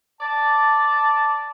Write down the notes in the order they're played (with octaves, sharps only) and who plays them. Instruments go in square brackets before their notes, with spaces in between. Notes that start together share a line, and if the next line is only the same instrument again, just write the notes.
[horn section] D5 A5